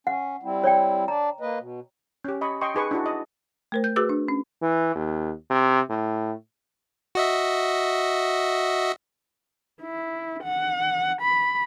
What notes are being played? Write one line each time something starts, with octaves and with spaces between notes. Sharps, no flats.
C#4 F#5
G3 C4 E4
C#5 D5 G5
D4 D5 A#5
A#3 B4 D#5
B2
C#4 G4
D#5 G#5 B5 C#6
D#5 G5 C6 C#6
D#4 G#4 B4 C#6
D4 E4 F#4
D#5
A3 A#4 C5
G6
F#4 G#4 B4 D6 E6
D4
C#4
E3
D#2
C3
A2
F#4 D#5 E5
E4
F#5
B5